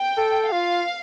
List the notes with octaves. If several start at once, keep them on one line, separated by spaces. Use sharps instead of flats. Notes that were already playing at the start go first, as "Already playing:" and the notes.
Already playing: G5
A4
F4 F5